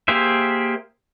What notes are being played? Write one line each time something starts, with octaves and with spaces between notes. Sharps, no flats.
A#3 G4 G#4 C5 E5